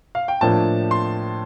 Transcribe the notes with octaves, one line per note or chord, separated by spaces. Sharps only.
F5
G5
A2 F3 A#3 D4 A5
C6